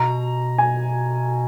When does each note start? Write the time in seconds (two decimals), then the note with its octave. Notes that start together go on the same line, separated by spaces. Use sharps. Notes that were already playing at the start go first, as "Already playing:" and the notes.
Already playing: B2 A#5
0.58 G#5